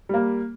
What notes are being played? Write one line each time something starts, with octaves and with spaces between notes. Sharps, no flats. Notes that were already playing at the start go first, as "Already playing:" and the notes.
G3 A#3